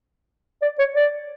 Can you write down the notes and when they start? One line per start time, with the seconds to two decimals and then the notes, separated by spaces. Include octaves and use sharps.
0.62 D5
0.79 C#5
0.96 D5